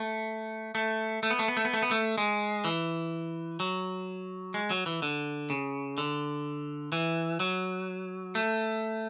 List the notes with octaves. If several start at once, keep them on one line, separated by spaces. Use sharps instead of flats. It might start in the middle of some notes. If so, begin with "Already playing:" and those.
Already playing: A3
A3
A3
B3
A3
B3
A3
B3
A3
B3
A3
G#3
E3
F#3
G#3
F#3
E3
D3
C#3
D3
E3
F#3
A3